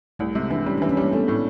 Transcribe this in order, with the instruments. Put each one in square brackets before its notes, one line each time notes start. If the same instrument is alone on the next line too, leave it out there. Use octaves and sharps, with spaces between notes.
[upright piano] C2 [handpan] A3
[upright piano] C3 [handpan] G#3
[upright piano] E3 [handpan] D4
[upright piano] G3 [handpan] C#4
[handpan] D4
[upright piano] E3
[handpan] C#4
[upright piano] G3 [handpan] A#3
[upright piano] A3 [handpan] B3
[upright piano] A2